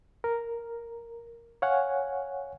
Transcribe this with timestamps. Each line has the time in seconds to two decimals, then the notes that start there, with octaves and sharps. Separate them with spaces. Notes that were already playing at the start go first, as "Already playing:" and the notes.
0.24 A#4
1.62 C#5 F5 F#5 G#5